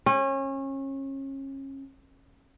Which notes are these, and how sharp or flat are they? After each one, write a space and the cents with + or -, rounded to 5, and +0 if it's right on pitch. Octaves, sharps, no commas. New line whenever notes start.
C#4 -30